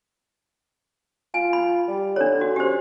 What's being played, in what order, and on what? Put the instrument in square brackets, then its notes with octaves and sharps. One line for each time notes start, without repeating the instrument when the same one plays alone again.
[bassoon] F4 [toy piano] G#5
[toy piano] B5
[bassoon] G3
[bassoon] D3 [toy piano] D4 C#5
[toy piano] F#4
[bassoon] C#4 [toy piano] G4 C5